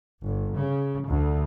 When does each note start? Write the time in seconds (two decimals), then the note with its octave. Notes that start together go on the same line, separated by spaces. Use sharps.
0.24 G1
0.56 C#3
1.09 D2